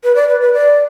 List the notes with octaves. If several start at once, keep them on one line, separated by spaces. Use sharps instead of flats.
B4
D5
B4
B4
D5